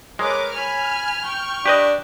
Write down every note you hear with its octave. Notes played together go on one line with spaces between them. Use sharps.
G#3 A#4 B4 C#5 D6
G#5 B5 F6
G5 C#6
D4 G4 B4 D#5